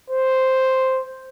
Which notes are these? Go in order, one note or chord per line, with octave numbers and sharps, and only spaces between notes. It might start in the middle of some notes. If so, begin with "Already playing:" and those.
C5